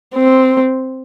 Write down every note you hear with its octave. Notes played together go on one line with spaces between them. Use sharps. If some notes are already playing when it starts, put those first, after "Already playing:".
C4